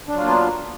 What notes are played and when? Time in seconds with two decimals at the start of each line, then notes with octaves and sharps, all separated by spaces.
0.08 D4
0.13 F#3
0.18 F4
0.23 A#3
0.28 B3